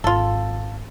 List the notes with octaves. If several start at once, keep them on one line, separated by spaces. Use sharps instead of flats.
G#1 F4 A4